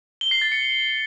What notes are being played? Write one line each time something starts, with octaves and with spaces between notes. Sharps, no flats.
G7
C7
A6
C#7